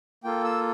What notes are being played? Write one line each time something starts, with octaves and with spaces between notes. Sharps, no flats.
A#3 F4 A4 G5
E6